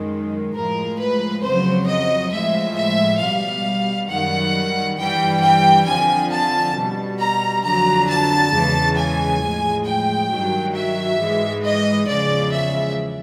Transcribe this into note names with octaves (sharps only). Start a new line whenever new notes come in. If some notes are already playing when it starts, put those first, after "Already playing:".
Already playing: F#2 D#3 G#3
A2 F3 G#3 A#4
B4
F2 C#3 F#3 C5
D#5
A2 F3 G#3 E5
E5
B2 G3 F5
F#2 D#3 G3 F#5
G2 E3 G3 G5
G5
F2 D3 F3 G#5
A5
B2 G3
A#5
F2 D3 F#3 A#5
A5
E2 C#3 E3 G#3
G#5
A2 F3 G#3
G5
G2 D#3 F#3
E5
G#2 E3 G#3
D#5
E2 C#3 F3 G#3 D5
E5